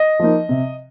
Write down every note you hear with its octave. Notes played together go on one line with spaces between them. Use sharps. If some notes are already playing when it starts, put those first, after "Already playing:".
Already playing: D#5
F3 A#3 D#4
C3